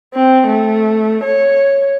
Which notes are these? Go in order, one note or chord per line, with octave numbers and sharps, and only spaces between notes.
C4
A3
C#5